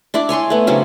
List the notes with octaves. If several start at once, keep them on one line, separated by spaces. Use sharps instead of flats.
D4 E4 D5
C#5 G#5 C6 C#6
A3 B3
C#3 F#3 C4 D4